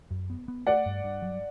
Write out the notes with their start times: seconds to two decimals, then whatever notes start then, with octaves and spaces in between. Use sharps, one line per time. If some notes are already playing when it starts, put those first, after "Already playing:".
0.11 F#2
0.30 B3
0.48 B3
0.67 A3 D5 F#5
0.86 G2
1.04 G2
1.22 F#3